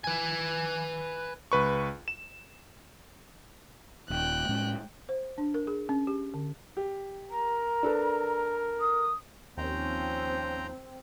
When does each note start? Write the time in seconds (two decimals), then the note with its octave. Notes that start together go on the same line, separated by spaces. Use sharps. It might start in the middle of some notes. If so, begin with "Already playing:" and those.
0.04 B4 G#5
1.52 C#2 B4 C#6
2.08 E7
4.10 D#1 G5 F#6
4.49 A2 G#3 C#4
5.09 C5
5.38 D4
5.54 A#4
5.67 G#4
5.89 C#4
6.07 G4
6.34 D3
6.77 G4
7.31 A#4 A#5
7.83 D4 A4 B4
8.80 D#6
9.57 D#2 F3 C4 C#4 C5 G5 A#5